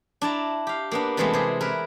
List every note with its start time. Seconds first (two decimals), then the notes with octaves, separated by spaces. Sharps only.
0.22 D4 E4 A5 A#5
0.67 G4 F5
0.91 A#3 B3 D4
1.17 C3 E3 G#3 A3 B3 C4
1.34 C3 G#4
1.61 E4 A#4 B4